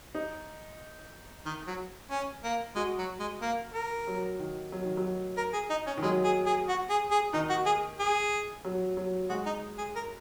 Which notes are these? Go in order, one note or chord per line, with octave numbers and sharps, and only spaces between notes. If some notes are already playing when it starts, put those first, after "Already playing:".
D#4
D#3
F#3
C#4
A#3
G#3 F#4
F#3
G#3
A#3
A#4
F#3
D#3
F#3
D#3
F#3
A#4
G#4
D#4
C#4
D#3
F#3 G#3
G#4
G#4
F#4
G#4
G#4
D#3 D#4
F#4
G#4
G#4
F#3
F#3
G#3 F#4
D#4
G#4
A#4